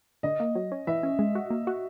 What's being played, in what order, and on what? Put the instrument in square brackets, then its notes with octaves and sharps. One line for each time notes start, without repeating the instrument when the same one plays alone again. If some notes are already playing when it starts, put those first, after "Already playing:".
[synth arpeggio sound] D3 [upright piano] D#5
[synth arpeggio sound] A#3
F#3
C#4
[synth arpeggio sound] E3 [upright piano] E5
[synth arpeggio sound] C#4
G#3
F#4
A#3
F#4